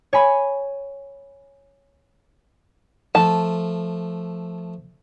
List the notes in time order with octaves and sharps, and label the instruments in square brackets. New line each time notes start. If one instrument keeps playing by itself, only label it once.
[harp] C#5 G#5 B5
[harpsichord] F3 A3 [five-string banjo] A5